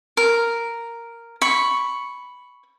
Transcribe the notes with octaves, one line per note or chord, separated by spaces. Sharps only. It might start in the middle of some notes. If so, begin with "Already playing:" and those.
A#4
B5 C#6